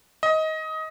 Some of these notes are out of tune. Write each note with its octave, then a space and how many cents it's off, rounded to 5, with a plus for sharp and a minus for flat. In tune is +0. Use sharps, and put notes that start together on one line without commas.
D#5 +20